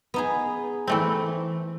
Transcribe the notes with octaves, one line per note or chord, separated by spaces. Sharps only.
B3 D#4 G#4
E3 A3 C4